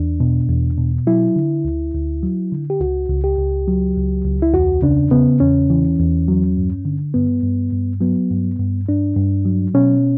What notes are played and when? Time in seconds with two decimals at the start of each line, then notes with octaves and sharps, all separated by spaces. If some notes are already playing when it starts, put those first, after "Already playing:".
Already playing: E2 D4
0.20 B2
0.48 E2
0.78 B2
1.07 F#3 E4
1.36 D3
1.65 D2
1.94 D2
2.23 F#3
2.52 D3
2.70 G4
2.80 C#2 F#4
3.09 C#2
3.24 G4
3.38 C#2
3.68 F#3
3.97 C#2
4.25 C#2
4.42 E4
4.54 E2 F#4
4.82 C#3 D4
5.11 C#3 B3
5.40 E2 C#4
5.70 E3
5.99 E2
6.28 F#3
6.57 G2
6.85 D3
7.14 G2 B3
7.43 G2
7.73 G2
8.01 F#3 B3
8.30 G2
8.59 G2
8.89 G2 D4
9.17 G2
9.45 F#3
9.74 B2 C#4